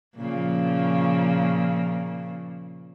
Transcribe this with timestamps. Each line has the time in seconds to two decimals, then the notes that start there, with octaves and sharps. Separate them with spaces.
0.16 A#2 C#3 F3